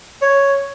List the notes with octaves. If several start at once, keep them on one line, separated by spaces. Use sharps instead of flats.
C#5